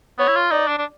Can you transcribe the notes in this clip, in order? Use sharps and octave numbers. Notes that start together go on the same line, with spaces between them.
B3 C#5
E4
F4
D#4 D5
D4
D4